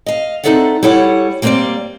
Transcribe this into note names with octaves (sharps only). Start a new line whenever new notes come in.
D#5 F5
C4 D#4 A4 D5 E5 F#5
G3 E4 A4 C#5 F#5
G3 A#3 C4 B4 C5 D5